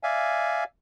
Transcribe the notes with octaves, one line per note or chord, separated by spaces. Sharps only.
D5 E5 F5 G#5